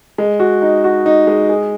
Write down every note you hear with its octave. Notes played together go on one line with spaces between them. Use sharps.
G#3
F#4
D#4
F#4
D#4
G#3
G#4